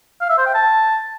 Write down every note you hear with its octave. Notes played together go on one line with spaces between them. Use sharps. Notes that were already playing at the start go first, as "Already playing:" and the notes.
F5
E5
C5
G5
A5